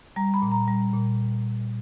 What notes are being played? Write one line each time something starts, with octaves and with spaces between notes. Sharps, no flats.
G3 A#5
B5
A#2
A#5
G3
A#2